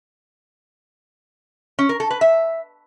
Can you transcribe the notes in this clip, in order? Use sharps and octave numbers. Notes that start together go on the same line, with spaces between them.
C#4
A#4
A4
B4
E5